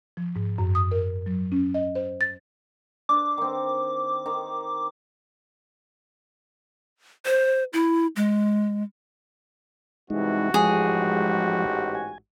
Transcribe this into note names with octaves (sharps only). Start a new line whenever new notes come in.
F3
G#2
F#2
D#6
A#4
F#3
C#4
D#5
C5
A6
D4 D6
D#3 C4
D#3
C5
E4
G#3
G2 C3 E3 G#3 D#4 F#4
A1 G#2 F3 G#3 G4 G#4
G#5